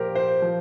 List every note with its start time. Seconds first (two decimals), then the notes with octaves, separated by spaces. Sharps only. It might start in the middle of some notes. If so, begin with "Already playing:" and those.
Already playing: A#2 F3 G4 A#4 C5
0.15 C5
0.42 F3